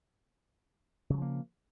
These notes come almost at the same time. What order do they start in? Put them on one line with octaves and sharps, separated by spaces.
C#3 F#3 F3 A#3